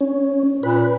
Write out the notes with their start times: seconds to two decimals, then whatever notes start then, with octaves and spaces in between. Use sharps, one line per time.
0.01 C#4
0.63 A#2 B4